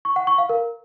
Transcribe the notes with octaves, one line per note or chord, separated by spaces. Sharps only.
C#6
F#5
C#6
F5
A#4